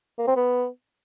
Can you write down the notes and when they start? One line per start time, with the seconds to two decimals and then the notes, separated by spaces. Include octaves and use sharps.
0.18 A#3
0.27 C4
0.36 B3